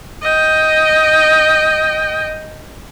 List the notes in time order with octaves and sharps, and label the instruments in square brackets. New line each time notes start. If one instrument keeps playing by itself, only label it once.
[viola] D#5 G5